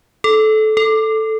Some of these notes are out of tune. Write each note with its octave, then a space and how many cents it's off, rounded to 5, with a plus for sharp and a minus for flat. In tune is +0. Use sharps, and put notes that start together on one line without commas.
A4 -20
A4 +0